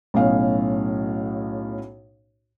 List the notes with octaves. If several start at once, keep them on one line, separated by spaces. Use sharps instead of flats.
B1 A2 C#4 F5